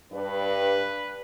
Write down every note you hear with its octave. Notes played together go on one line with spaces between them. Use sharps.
G2 B4